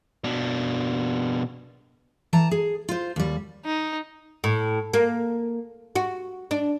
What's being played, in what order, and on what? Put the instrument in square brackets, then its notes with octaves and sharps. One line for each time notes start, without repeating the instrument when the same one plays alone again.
[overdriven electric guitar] B2 D4
[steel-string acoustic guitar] E3 A5 A#5
G#4
F4 C5
D#2 G3
[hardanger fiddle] D#4
[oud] A2
A#3
F#4
D4